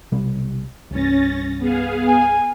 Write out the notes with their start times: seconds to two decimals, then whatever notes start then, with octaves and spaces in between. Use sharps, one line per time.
0.12 B1 C3 G3
0.91 C2 G2 C#4 A6 A#6
1.58 B3 G#4 F5
2.07 G#5